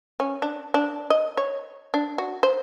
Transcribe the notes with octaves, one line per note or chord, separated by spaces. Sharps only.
C#4
D4
D4
D#5
C#5
D4
F#4
C5